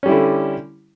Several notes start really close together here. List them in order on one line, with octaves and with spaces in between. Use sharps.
C#4 G3 E4 D3